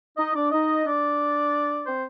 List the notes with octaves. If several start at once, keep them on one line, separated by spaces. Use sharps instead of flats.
D#4 D#5
D4 D5
D#4 D#5
D4 D5
C4 C5